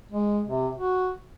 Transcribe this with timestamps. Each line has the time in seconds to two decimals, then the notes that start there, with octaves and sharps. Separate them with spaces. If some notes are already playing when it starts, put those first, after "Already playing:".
0.11 G#3
0.47 C3
0.75 F#4